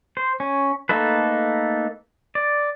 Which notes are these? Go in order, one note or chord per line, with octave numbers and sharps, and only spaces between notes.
C5
C#4
A3 A#3 D#4 A4 B4
D5